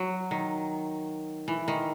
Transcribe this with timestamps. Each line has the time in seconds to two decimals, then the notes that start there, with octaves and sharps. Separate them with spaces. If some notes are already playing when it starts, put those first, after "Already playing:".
Already playing: F#3
0.31 D#3
1.48 E3
1.68 D#3